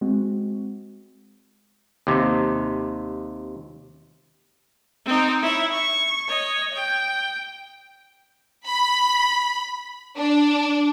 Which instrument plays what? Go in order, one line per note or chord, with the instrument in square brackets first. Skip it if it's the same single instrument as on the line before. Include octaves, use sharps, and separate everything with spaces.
[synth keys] G#3 C4 F#4
[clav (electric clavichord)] D#2 C3
[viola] C4 D#4
E4 C#5
C#6
C#5 D#5
G5
[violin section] B5
D4